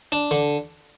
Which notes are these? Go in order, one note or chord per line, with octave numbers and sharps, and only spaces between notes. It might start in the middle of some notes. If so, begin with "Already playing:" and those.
D4
D3